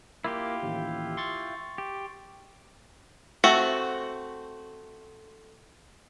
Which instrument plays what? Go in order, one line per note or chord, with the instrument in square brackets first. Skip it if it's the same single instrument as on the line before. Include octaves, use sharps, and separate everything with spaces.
[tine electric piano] A#3 [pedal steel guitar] E4 F4 G4
[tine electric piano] A1 D#2
C6 C#6 A6
[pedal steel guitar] G4
[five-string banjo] A3 C4 F#4